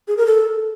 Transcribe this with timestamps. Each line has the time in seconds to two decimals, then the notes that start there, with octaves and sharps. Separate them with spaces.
0.08 G#4
0.17 A#4
0.27 A4